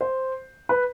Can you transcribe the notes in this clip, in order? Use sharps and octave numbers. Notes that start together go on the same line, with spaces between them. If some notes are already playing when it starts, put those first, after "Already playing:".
C5
B4